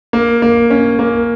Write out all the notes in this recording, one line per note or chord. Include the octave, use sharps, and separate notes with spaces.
A#3
A#3
C#4
A#3